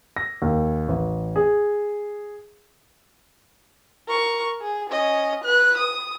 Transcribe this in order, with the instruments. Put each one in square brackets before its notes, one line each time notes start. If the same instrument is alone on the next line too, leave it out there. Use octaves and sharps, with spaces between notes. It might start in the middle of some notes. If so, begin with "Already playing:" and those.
[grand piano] A#6
D#2
A1
G#4
[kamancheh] A#4 C#6
G#4
C#4 D#5
B4 F#6
D#6